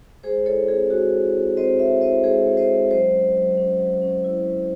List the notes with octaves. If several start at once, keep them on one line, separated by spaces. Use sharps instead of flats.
G#3 G#4 C5
E4 A4 C#5
C4 G#4
G#3 F#4
E4
C4
C4 C5 D#5
E4 C#5 E5
E4 C5 D#5
G#3 G#4 C5
G#3
C5 D#5
G#3
F#3 C5 D#5
C#4
F#3
C#4
F#3
C#4
E4
F#3